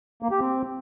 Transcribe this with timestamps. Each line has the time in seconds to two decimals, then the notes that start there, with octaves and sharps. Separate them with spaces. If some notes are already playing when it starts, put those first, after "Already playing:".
0.23 A#3
0.31 G4
0.40 C4